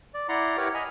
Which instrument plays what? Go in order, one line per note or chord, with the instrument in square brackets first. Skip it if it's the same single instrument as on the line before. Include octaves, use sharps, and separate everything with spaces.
[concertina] D5
E4 D5 F#5 A#5 C6
E4 G4 A#4 B4 C#5 F#5
D#5 G#5 B5 F6